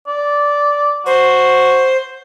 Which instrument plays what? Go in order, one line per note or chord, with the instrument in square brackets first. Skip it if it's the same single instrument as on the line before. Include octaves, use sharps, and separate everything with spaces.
[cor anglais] D5
[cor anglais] F#4 [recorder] C5